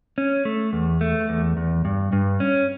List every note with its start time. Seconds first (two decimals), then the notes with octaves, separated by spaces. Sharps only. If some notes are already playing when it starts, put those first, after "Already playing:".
0.18 C#4
0.45 A3
0.73 E2
1.01 A3
1.29 E2
1.57 E2
1.85 G2
2.13 G2
2.40 C#4